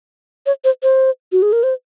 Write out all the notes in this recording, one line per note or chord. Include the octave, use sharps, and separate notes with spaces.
C#5
C5
C5
F#4
G#4
A#4
C5